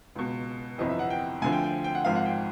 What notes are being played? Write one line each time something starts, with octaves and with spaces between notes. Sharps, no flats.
C#2 B2
G1 F2 C3 E3 D#5
E5
F#5
G5
D2 D3 F3 G#5
G5
G5
G5
F#5
G#1 G#2 F3 F5
F#5
G5